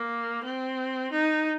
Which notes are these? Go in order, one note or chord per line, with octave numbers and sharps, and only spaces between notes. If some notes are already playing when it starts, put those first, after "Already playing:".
Already playing: A#3
C4
D#4